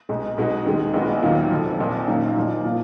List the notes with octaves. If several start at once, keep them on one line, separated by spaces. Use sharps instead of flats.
B1 B2 G#3
B1 B2 G#3 D#4 F#4
D#2 D#3 G#3
A#1 A#2 G#3 B3 F#4
D#2 D#3 F#3 A#3 F4
F1 F2 F3
A#1 A#2 F3
F#2 D#3 F#3 A#3
A#1 A#2 F3 A#3 D#4
F3 A#3 F4